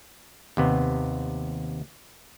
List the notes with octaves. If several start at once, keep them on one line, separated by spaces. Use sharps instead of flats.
D#2 C3 B3